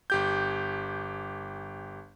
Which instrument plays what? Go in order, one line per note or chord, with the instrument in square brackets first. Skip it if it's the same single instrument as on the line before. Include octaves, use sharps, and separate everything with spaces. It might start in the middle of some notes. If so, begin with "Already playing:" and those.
[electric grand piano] G1 G4 G6